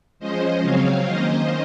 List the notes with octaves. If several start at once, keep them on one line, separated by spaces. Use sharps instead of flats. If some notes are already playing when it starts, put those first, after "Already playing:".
F3 G#3 C#4 C5 D#5
C#3 F#3 C4 C#5 F5
D#3 A#3 C#4 C5 D#5